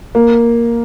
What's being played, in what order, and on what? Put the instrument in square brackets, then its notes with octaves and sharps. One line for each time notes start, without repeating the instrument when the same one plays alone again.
[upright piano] A#3